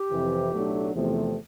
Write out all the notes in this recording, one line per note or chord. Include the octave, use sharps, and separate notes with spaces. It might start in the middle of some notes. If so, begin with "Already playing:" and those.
Already playing: G4
F2 C3 E3
B1 A2 F#3 A3 D4
E2 C3 F3 A3